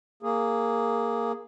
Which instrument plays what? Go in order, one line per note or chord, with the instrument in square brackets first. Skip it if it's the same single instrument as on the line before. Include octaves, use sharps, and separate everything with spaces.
[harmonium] A#3 G#4